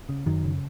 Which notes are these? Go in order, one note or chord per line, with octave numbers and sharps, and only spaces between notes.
C#3
F#2 D#3 F#3
C#3